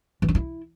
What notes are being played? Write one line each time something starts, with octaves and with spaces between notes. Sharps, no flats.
E3
D4
E4